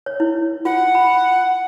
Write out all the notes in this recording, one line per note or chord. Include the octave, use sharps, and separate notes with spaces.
C#5
E4
F4 F#5
B5